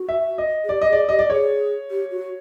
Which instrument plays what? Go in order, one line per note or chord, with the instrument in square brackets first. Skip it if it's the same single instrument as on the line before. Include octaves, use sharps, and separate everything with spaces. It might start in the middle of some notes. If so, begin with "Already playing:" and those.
Already playing: [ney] F#4
[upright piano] E5
D#5
[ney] G#4
[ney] G4 [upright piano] D5
[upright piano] D#5
[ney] G#4 [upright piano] D5
[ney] G4 [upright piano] D#5
[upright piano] D5
[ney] G#4 [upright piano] C#5
[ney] G4
F#4